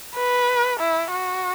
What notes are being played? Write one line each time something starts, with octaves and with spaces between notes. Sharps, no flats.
B4
E4
F#4